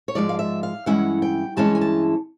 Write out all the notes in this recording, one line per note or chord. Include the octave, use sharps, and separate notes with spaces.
C#5
G#2 F3 G#3 D5
F5
E5
F5
G2 E3 G#3 C#4 E4 F#5
G5
G2 E3 G#3 C#4 E4 A5
G#5
A5